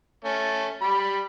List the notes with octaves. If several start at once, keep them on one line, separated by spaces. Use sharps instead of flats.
A3 C#4
G3 B5